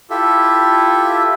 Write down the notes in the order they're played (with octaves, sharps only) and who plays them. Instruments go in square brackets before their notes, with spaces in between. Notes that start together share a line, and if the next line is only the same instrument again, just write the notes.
[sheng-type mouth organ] E4 F4 G4 A4 E5